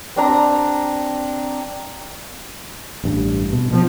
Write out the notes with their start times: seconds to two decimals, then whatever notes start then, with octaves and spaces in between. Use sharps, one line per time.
0.16 C4 D4 A#5
3.04 A1 G2
3.53 B2
3.71 B2 F3 A#3 C4